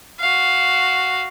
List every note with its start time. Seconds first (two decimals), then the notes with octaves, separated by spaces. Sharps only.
0.19 F#4 F5